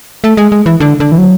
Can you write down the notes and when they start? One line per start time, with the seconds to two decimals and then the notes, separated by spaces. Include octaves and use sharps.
0.24 A3
0.37 G#3
0.52 G#3
0.66 E3
0.80 D3
1.00 D3
1.12 E3
1.18 F#3